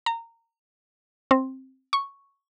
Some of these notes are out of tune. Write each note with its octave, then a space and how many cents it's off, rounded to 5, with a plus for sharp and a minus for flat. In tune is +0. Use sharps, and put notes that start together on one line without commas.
A#5 -20
C4 +10
C#6 +0